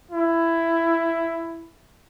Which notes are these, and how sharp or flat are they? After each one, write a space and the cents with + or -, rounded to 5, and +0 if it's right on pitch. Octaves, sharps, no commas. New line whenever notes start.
E4 +10